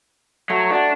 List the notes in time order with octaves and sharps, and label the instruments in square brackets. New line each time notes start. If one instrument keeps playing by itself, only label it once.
[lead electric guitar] F#3 [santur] A3
[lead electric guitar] D4 [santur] F#4 F#5